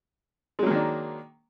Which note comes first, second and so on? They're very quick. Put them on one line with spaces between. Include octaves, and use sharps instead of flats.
G#3 F#3 A#3 D#3 D4